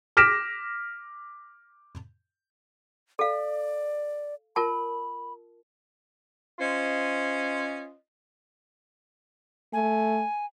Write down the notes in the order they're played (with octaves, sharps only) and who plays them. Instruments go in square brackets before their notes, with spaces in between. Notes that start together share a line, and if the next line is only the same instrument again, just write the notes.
[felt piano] D6 F6 A#6 B6 D7 E7
[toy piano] A4 F5 [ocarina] D5
[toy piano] F4 A#4 A5 [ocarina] B5
[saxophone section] C#4 F4 C5 D#5
[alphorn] A3 [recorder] G#5